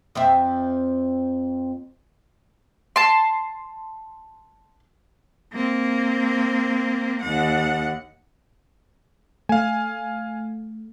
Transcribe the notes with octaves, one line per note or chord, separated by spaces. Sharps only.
F2 C4 E5
A5 C6
A#3 C4
D#2 F#5
A3 F5 G#5